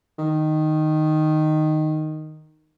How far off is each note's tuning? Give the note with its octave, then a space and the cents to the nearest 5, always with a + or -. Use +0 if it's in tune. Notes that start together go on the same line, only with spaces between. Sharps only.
D#3 -5